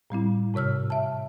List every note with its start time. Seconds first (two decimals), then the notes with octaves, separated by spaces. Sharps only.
0.10 A2 G3 C4 E4
0.54 G#2 C3 C#5 E6 F6
0.90 E5 A5